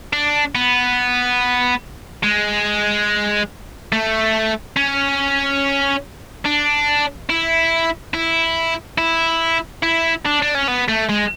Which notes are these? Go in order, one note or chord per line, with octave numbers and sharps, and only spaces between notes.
D4
B3
G#3
A3
C#4
D4
E4
E4
E4
E4
D4
D4
C#4
B3
A3
G#3